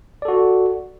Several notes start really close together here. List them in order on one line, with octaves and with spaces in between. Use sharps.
D5 A4 F#4